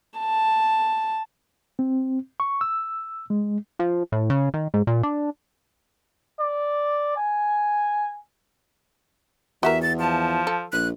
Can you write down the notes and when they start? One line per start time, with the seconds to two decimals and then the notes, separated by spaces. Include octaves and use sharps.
0.19 A5
1.79 C4
2.40 C#6
2.61 E6
3.30 G#3
3.79 F3
4.12 A2
4.30 C#3
4.54 D#3
4.74 G#2
4.87 A#2
5.03 D4
6.40 D5
7.17 G#5
9.63 E2 F#4 G4 A#4 E5
9.82 A6
9.99 F3 A5
10.47 A4
10.72 A#1 F#6